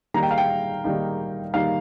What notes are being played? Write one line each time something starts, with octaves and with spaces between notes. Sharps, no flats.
D#3 G3 A#3 D#4 A#5
G5
F5
G5
D#3 G3 A#3 D#4
D#3 G3 A#3 D#4 F5